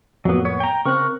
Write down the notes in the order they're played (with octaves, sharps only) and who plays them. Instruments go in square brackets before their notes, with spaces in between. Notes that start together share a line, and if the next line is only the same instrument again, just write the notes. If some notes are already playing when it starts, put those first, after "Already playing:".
[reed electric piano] F2 A2 A#3 [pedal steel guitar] F#3 B3
[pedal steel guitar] B3 C#5
G5 A#5
[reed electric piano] C#3 C4 F#6 [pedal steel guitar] A#4 C#6